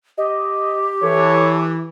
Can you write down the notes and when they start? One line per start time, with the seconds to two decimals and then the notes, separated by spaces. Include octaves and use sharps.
0.18 G4 D#5
1.03 E3 A4 C#5